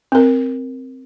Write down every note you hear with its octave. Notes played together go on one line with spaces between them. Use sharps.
C4 A#4